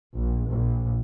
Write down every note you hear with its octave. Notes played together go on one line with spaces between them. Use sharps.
A#1
A#1